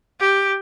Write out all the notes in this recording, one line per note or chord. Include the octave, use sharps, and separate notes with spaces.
G4